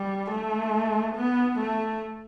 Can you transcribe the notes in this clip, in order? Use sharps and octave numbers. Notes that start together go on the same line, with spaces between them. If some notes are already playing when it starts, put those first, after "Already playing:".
Already playing: G3
A3
B3
A3